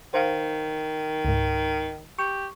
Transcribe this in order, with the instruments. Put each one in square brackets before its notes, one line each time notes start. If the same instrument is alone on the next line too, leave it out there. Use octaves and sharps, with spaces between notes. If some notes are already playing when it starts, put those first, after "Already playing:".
[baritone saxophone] D#3 [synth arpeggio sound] C5 F5
[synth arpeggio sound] C#2 G#2
[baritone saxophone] G4 [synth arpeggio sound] C#6